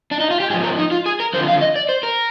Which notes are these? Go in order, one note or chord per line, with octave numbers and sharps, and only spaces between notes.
D4
D#4
F4
G4
G#2 F3 G#4
A#4
D#4
F4
G#4
A#4
F2 D3 F3 C5
F5
D#5
D5
C5
A#4